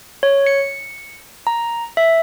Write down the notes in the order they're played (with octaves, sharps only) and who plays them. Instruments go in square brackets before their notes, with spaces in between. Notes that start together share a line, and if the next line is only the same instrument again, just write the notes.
[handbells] C#5
C#7
A#5
E5